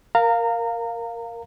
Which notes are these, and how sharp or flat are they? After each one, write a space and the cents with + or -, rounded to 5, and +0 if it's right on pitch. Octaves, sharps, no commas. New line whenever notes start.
A#4 +0 F5 +0 A#5 -25